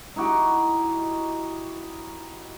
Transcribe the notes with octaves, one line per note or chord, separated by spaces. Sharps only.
D#4 E4 F#4 G4